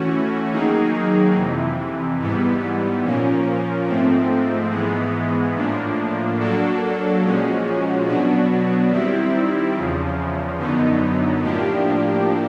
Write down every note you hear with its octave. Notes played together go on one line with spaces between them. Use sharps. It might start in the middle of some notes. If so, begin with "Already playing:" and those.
Already playing: E3 A3 C#4 F#4
D#3 F#3 A#3 D#4 G#4
F2 C3 E3
G#2 E3 G3 B3
A#2 F3 A#3 C#4
G#2 F3 A3 C4
G#2 E3 G#3 B3
A2 F3 A#3 D4
F#3 A#3 D4 F#4 A4
A#2 F3 G#3 C#4 F#4
B2 F#3 B3 D4 F#4
D#3 G3 C4 E4
E2 C#3 F3
F#2 D3 F#3 B3 D#4
A2 F3 A#3 D4 G4